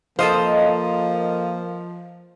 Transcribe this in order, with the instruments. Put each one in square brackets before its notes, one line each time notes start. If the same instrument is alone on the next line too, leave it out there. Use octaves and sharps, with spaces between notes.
[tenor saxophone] F3 [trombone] A#3 [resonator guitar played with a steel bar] A4 C5 [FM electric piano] D#5 F5